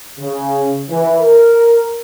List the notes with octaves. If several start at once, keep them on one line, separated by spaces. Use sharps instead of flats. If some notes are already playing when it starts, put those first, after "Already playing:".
C#3
E3
A#4